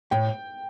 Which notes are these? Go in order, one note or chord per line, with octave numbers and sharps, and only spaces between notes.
A2 G5